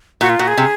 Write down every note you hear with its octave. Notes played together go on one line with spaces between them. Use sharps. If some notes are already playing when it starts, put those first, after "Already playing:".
A#2 F#4
F4
A#2 F#4
G#4
C3